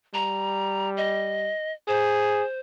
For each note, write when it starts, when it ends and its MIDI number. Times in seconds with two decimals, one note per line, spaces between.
0.14 1.50 55
0.14 0.90 82
0.97 1.73 75
1.88 2.43 68
1.88 2.59 72